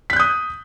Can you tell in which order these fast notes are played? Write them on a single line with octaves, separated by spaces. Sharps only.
B6 F#6 G6 D#6